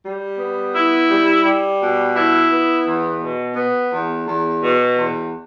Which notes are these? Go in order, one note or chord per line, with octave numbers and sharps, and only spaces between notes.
G3
B3
E4
G3
G3
B2
E4
B3
E2
B2
B3
E2
E2
B2
E2